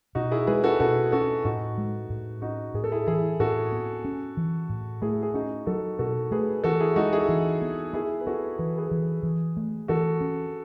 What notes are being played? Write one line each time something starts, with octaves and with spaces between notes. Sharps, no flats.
B2 D#4 F#4
E4 G#4
G#3 G#4 B4
F#4 A4
B2 F#4 A4
C#4 F#4 A4
A2 D#4 F#4
G#3
A2
C#4 D#4 F#4
A2 G#4
A4
E4 G#4
E3 E4 G#4
A2 F#4 A4
B3
C#4
E3
A2
A3 E4 G#4
G#4
C#4 D#4 F#4
F#3 F#4 A4
B2 F#4 A4
A3 G#4 B4
E3 F#4 A4
E4 G#4
G#3 D#4 F#4
E4 G#4
E3
B3
B3 E4 G#4
B4
B3 F#4 A4
E3 B4
G#4 B4
E3
E3
A3
E3 F#4 A4
C#4